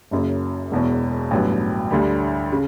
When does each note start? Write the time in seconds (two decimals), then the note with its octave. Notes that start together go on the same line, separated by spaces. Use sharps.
0.11 F#1 F#2 C#3 F#3
0.71 E1 E2 B2
1.31 A1 G2 F#3 B3
1.91 D2 D3 G3
2.52 C#3